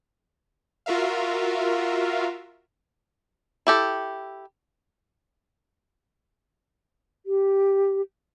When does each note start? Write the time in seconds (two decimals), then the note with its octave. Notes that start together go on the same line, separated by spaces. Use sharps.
0.86 F4 F#4 A#4 E5 F5
3.67 E4 G4 A4
7.26 G4